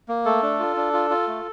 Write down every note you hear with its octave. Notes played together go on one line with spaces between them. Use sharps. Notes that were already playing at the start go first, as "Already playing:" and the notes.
A#3
A3 A4
D4
F4
D4
F4
F4
A3